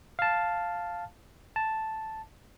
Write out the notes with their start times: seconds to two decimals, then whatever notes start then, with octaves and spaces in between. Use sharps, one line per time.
0.19 F5 A5
1.56 A5